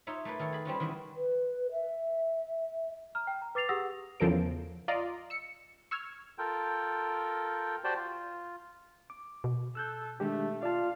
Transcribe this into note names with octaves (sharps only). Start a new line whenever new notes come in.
D#4 F4 C#5 E5
A3 A#3 B4
D#3 A4 C#5
G#4 B5
G3 C4 C#4 F4
D#3 E3 F#4 B4
B4
E5
A#5 F6
G5
A#5
B4 D6 A6 C7 F7
G4 G#4 F#5 D#6 E6 A#6
E2 C#3 F3 A4 A#4 D7
F4 D5 D#5 A#5 C6
E6 C#7
C#6 E6 F6 G#6
F4 A4 A#4 G5
F#4 G4 C5 D5 G5 A5
F4
D6
B2
A4 E6 F#6 G6
D#3 G#3 A3 D4 G4
F4 D5 F5 A5